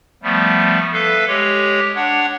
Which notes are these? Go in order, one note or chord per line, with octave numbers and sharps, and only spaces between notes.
F3 G3 A3 B3
A4 B4 E5 F5
G#3 G4 C#5
D4 C#5 F#5